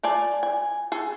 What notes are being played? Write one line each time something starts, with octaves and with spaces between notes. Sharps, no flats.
F4 D5 G#5 A5
G#5
G#4 A4